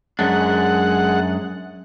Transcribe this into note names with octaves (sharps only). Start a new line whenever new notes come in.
F#2 G#3 D4 F#5